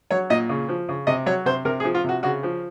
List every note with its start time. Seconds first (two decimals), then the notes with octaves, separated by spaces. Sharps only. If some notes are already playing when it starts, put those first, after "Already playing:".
0.11 F#3 C#5
0.30 A#2 D#5
0.49 C#3
0.69 F3
0.89 C#3
1.07 C3 D#5
1.26 F#3 C#5
1.45 C3 C5
1.65 C3 A#4
1.80 G#4
1.84 F3
1.94 F4
2.04 C3 F#4
2.23 C#3 F#4
2.43 F3